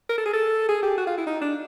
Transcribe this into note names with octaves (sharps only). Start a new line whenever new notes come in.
A#4
A4
G#4
A4
G#4
G4
F#4
F4
E4
D#4
D4